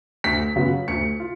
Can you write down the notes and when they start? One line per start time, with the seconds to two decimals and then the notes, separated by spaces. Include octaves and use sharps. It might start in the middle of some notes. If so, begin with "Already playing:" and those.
0.24 D2 B6
0.56 C#3 F#3 B3 F4
0.88 D2 C#7
1.20 F4